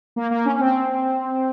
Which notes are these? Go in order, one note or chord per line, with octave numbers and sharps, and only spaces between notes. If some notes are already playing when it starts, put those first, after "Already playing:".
A#3
A#3
C#4
C#4
C4